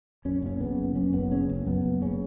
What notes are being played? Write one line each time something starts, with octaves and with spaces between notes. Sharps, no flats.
F#2 C#4
F#1 C#4
C#3 B3
F#1
F#2 C#4
F#1 B3
C#3 C#4
F#1
F#2 B3
F#1
C#3 C#4